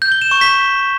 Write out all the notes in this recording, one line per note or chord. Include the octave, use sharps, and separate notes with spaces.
G6
G7
E7
C#6
B6